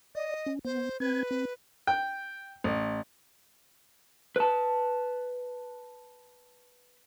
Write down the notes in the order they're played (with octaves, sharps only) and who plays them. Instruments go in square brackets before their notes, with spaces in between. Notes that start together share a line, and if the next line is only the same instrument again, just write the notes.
[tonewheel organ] D5 [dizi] D#5
[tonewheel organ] C#4
[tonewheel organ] B3 [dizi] C5
[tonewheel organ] C4 G#6 [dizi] B4
[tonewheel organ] C4
[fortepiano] G5
A1
[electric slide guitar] B4 A5